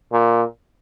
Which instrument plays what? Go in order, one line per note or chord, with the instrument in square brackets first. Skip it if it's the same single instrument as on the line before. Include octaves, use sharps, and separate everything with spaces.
[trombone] A#2